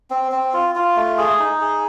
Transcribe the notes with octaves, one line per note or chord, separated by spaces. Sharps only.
C4
C4
F4
F4
A3
G#4
D#4
G#4